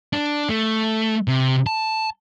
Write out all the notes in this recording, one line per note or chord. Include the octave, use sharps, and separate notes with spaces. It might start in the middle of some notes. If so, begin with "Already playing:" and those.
D4
A3
C3
A5